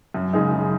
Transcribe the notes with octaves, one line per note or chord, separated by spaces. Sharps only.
F#2
C#3 G#3 D#4 G#4
F#2